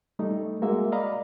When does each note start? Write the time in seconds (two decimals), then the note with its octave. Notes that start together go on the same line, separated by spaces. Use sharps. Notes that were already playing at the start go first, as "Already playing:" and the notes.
0.19 G3 A3 D#4
0.62 G#3 A#3 F#4 E5
0.92 D5 D#5 F5 A#5 B5